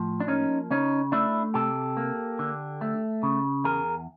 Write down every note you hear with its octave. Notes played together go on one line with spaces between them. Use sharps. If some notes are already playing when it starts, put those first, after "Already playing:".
Already playing: A2 F3
D4
A#3 C#4 D#4
C#3 C#4 D#4
A3 D4 E4
C3 G4 A4
A#3
D3
A3
C#3
E2 G#4 A#4